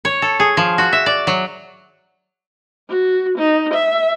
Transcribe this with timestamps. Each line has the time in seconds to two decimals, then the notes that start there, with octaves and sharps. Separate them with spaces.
0.05 C#5
0.22 A4
0.40 G#4
0.57 F3
0.78 F#4
0.93 E5
1.06 D5
1.27 F#3
2.89 F#4
3.38 D#4
3.74 E5